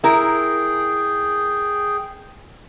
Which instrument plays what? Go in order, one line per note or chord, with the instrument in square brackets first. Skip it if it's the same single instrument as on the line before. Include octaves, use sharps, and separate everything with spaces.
[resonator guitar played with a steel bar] E4 A#4 [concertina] G#4 G5